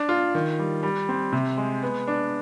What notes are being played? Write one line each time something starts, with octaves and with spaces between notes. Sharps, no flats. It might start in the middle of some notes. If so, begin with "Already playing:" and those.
Already playing: D4
F4
D#3
G3
G3
C4
C3
G#3
B3
D4